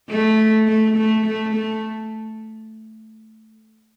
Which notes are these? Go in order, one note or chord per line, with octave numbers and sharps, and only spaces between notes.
A3
A3
A3
A3
A3